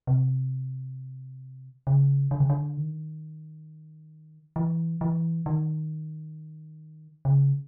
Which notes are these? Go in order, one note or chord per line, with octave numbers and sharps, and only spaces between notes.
C3
C#3
D3
C#3
D3
D#3
E3
E3
D#3
C#3